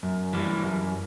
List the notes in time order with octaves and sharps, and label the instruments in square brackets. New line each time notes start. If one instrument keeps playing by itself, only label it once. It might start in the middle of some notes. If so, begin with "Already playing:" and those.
[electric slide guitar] F#2
E3 G3
F#2